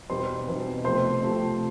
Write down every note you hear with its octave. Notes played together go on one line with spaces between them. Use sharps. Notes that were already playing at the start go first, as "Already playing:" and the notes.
E2 B2 G3 C4 D#4 C5 C6
E2 B2 G3 C4 D#4
C3 F3 A3 C4 C5 C6
C3 F3 A3 C4